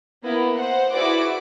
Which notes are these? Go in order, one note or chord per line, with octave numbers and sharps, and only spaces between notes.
A#3 B3 E4 A#4
C5 F#5
E4 F#4 G#4 B4 D5 D6